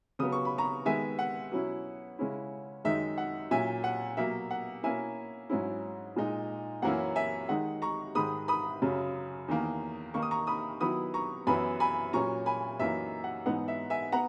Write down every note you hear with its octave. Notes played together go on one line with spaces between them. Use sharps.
C#3 F#3 B3 D#6
C#6
B5
A#5 C#6
D#3 G#3 B3 E5 G#5
F#5
B2 F#3 C#4 E4
C#3 G#3 C#4 E4
F#2 D#3 G#3 D#4 E5
F#5
A#2 F#3 C#4 E5 G#5
F#5
B2 F#3 A#3 E5
F#5
B2 A#3 C#4 E4 E5 G#5
G#2 F#3 C#4 E4
A#2 G#3 D#4
F#2 E3 A#3 C#4 E4 F#5
E5 G#5
D#3 G#3 D#4 F#5
A#5 C#6
G#2 D#3 G#3 B5 D#6
B5 D#6
F#2 C#3 F#3
E2 D#3 A#3
D#3 A#3 D#4 C#6
D#6
A#5 C#6
B5 D#6
D#3 F#3 B3 E4 B5 D#6
A#5 C#6
F#2 E3 B3 E4 G#5 B5
G#5 B5
A#2 F#3 C#4 A#5 C#6
G#5 B5
F#2 E3 A#3 D#4 E5
F#5
G#2 E3 B3 D#4 F#5
E5
E5 G#5
B3 F#5 A#5